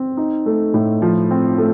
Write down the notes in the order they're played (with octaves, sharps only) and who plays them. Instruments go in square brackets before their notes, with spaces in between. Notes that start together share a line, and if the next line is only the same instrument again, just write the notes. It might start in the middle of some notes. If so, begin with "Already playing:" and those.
Already playing: [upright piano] C4
D#4
A3
A2
F3
C4
A3